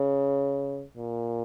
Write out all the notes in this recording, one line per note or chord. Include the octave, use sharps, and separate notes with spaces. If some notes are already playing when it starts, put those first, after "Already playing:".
Already playing: C#3
A#2